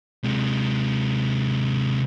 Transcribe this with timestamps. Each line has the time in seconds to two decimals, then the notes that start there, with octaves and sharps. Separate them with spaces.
0.24 C3 G#3